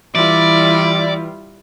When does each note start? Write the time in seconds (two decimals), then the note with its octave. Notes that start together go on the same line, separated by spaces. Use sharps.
0.15 E3 G3 E4 F4 D5